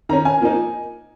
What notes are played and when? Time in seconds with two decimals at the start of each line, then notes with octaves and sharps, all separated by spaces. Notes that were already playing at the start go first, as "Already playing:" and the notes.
0.09 D#3 C#4 A#5
0.25 G#5
0.41 F3 A#3 D#4